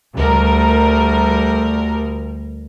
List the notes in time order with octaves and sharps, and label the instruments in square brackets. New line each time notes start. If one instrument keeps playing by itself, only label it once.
[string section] D2 G3 A#4